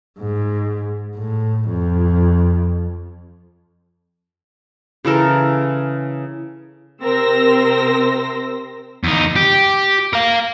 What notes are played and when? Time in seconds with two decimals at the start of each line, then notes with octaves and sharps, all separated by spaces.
0.19 G#2
1.16 A2
1.70 F2
5.05 C#3 E3 A4 A#4
7.02 C3 C4 A#4 C6 E6 A#6
9.03 E2 D#4
9.36 G4
10.13 A#4 F5